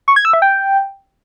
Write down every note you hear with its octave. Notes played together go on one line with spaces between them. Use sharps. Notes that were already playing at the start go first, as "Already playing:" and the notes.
C#6
G#6
E6
E5
G5